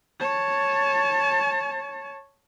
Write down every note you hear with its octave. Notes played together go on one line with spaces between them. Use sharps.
C#5 A5